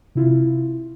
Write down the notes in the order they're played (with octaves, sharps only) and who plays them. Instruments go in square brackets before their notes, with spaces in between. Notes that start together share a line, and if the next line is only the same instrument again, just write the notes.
[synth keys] C3 E4 F4